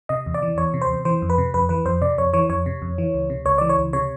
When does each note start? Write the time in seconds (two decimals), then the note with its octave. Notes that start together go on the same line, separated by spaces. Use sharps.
0.09 C3 D#5
0.26 E2
0.34 D5
0.42 E3
0.58 E2 C#5
0.74 C3
0.81 C5
0.90 E2
1.05 E3 C5
1.22 F2
1.30 B4
1.38 C3
1.54 F2 B4
1.69 E3 B4
1.85 F2 C5
2.02 C3 D5
2.18 F2 C#5
2.33 E3 C#5
2.49 F2 C#5
2.66 C3
2.82 F2
2.98 E3
3.14 C#2
3.30 C3
3.45 C#2 C#5
3.58 E3 D5
3.69 C#5
3.78 C#2
3.93 C3 C#5